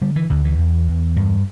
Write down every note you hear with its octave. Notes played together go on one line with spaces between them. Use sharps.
D3 G3
E3
D2 D3
E3
E2
E2
G2